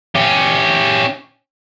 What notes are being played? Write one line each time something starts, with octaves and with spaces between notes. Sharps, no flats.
C#4 G4